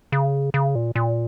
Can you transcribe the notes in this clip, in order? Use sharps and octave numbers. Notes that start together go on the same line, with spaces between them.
C#3
C#3
A#2
A#2